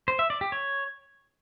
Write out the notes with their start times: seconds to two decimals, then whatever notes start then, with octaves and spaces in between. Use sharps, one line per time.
0.08 C5
0.19 E5
0.30 D5
0.41 G4
0.52 C#5